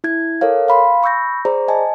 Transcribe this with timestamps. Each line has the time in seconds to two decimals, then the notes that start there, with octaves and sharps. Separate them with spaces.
0.04 E4 G#6
0.41 A4 A#4 C#5 F5
0.68 F5 B5 C6
1.03 B5 C#6 E6 G6 A#6
1.45 G#4 C5 D5 A#5
1.68 D#5 G#5 A5